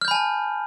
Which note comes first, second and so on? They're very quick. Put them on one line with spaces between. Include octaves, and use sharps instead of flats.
F6 G6 B5 G#5 A5